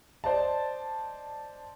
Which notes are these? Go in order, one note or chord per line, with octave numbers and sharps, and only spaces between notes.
C5 D5 D#5 A5